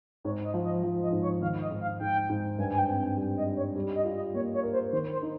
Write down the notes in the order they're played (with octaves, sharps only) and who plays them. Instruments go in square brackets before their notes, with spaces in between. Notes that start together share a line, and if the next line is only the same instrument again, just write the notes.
[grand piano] G#2 [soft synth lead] C#5
[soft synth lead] D#5
[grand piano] F3
[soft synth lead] D#5
[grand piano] F3
[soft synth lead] D#5
[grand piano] G#2
[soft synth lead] C#5
[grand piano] D#3 [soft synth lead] F5
[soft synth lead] D#5
[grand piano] G#2
[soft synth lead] F5
[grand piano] G#2 [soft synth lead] G5
[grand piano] G#2
[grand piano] G2 [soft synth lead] G#5
[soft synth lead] G#5
G5
[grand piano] C4
[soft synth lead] G5
[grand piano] G3
[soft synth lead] D#5
[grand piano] G3
[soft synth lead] C#5
[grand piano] G3
[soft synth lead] D#5
[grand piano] F4
[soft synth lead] D#5
[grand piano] A#3 [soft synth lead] C#5
[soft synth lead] C#5
[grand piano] A#4
[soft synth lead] C5
[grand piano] D#3 [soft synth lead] C5
[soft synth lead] C5
[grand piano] D#4